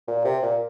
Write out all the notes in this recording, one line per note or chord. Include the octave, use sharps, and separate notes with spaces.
A#2
C3
A#2